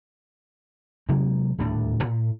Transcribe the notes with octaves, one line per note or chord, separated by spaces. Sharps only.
C3 F#3 G#3 A#3
D#1 D2 A2 D4
A2